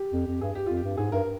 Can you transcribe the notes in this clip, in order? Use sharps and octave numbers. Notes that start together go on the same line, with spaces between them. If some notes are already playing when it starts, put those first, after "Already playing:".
Already playing: G4
F2
F2
G2 G#4
G4
F2 F4
G4
G2
G#2 G#4
G2 A#4